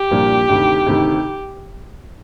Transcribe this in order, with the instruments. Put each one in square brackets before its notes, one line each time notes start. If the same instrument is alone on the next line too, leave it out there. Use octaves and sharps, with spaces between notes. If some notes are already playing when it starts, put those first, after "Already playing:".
Already playing: [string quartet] G4
[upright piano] C2 A#2 F3 A#3 D4
D2 C3 D#3
D2 C3 D#3